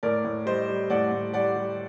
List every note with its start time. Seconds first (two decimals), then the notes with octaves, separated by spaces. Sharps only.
0.03 A2 A#4 D5
0.25 A2
0.46 G3 C5 D#5
0.69 G3
0.90 A2 D5 F#5
1.12 A2
1.33 G3 D5 F#5
1.56 G3